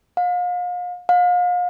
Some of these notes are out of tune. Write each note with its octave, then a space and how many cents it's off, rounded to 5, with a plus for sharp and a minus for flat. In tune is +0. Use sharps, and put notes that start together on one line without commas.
F5 +40
F5 +40